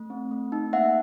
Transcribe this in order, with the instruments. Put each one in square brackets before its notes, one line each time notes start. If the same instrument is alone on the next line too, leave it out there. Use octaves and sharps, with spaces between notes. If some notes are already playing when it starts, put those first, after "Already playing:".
Already playing: [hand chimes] A3
C4
A3
D#4
A#3 E5 F#5